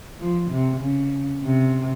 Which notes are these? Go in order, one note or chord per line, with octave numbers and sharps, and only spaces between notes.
F3
C3
C#3
C3